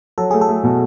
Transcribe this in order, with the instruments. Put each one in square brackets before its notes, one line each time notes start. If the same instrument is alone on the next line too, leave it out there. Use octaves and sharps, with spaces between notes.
[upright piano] F#3 [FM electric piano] A4
[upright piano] A3 [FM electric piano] G#4
[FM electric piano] A4
[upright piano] A3
B2